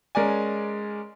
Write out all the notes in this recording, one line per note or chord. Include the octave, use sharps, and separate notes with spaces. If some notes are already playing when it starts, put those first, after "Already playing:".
G#3 C#4 A#4 D5 G#5